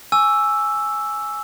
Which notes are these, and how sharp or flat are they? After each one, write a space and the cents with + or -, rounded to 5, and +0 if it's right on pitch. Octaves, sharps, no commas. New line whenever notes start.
G#5 +5 C#6 +40 E6 +0